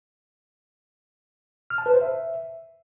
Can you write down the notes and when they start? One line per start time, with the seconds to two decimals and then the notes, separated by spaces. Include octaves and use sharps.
1.70 F6
1.78 A5
1.86 B4
1.94 C5
2.01 E5